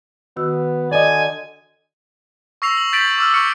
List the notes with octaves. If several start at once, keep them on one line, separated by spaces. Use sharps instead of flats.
D#3 B3 F#4 E6
D3 D5 D#5 G#5
C#6 E6 A#6 C7 F7
F#7
G6 A6 B6 D7 F#7
D6 E6 F6
C#6 F6 C#7